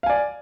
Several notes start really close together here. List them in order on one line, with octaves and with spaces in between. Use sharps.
F5 G#5 D5